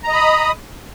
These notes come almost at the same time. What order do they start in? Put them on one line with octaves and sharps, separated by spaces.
A#5 D#5 B5 D#6